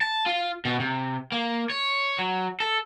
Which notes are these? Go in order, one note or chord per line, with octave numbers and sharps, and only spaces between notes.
A5
F4
B2
C3
A#3
C#5
F#3
A4